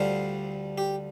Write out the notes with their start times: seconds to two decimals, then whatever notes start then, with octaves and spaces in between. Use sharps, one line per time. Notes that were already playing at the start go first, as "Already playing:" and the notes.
Already playing: D2 D3 G3 D4 F4 C5
0.78 G4